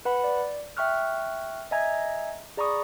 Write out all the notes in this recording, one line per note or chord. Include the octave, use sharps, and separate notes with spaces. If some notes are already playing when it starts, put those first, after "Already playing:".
B4 F#5 B5
D5
E5 G5 C#6 F6 F#6
D#5 E5 G#5 A#5 G#6
G#4 D5 A#5 B5 C#6 D#6